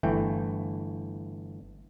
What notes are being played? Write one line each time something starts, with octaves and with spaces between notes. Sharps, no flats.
G1 E3 A3 G5